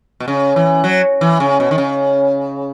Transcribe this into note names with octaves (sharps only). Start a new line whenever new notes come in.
B2
C#3
E3
F#3
E3
C#3
B2
D#3
C#3